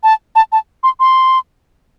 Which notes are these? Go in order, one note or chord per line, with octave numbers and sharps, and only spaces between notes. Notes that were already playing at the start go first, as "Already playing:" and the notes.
A5
A5
A5
C6
C6